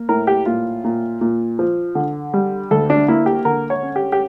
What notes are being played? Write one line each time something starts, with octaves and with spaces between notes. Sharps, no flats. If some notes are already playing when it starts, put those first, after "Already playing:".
Already playing: A#3
A2 A#4
G4
A#2 F4
A#2
A#2
F3
D3
G3
D2 A4
D4
A#3 E4
G4
D3 A#4
C#5
C#4
G4
G4